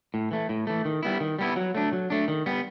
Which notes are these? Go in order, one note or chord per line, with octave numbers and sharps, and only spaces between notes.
A2
E3 A3
A2
E3 A3
D#3
G3 B3 E4
D#3
G3 B3 E4
F#3
A3 D4
F#3
A3 D4
D#3
G3 B3